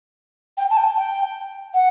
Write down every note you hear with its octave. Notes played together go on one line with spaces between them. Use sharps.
G5
A5
G5
G5
F#5